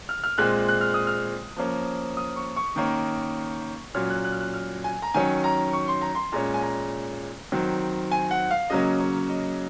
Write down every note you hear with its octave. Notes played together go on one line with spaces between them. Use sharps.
F6
F6
A#2 G#3 C4 F#6
F#6
F6
D#6
F6
F3 A#3 C#4
D#6
C#6
C#6
D#3 A#3 C#4
A#2 F#3 C#4 F6
F#6
F#6
F6
F#6
F6
G#5
A#5
D#3 F#3 C#4 G#5
A#5
C#6
C6
A#5
C6
A#2 G#3 C#4 A#5
G#5
A#5
D#3 F#3 C4
G#5
F#5
F5
C#3 F#3 A#3 C#4 D#5
C#5
D#5